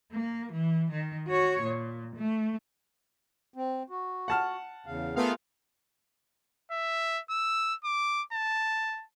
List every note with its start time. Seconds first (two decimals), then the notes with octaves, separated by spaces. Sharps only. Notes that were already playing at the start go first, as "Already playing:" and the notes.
0.12 A#3
0.52 E3
0.91 D#3
1.28 F#4 C#5
1.62 A#2
2.16 A3
3.54 C4
3.90 F#4
4.28 F#5 A5 F6
4.86 E2 C#3 F5
5.16 A3 B3 F4 G#4 A#4 F5
6.71 E5
7.30 E6
7.84 D6
8.33 A5